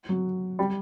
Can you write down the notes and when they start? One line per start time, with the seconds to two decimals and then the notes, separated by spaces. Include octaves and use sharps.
0.09 F#3
0.59 G3